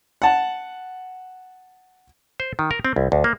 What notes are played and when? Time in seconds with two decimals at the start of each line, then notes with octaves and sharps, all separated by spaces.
0.22 F#5 A5
2.40 C5
2.59 D#3
2.71 A#4
2.85 C4
2.96 C2
3.12 D2
3.24 A#3